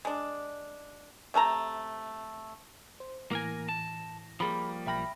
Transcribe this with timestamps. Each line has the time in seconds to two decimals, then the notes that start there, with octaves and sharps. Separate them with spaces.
0.05 G#3 D4
1.34 C3 A3 A5 A#5
3.00 C5
3.31 A2 E3 A#3 A#4 G#5 A#6
3.69 A5
4.40 F3 G3 A#3 G#4 B5
4.86 B1 E5 G5 B5 F6 A#6